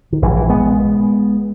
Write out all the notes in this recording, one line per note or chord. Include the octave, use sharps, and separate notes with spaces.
D#3
A#1 G#2 E3
D#3
E3
G#3 B3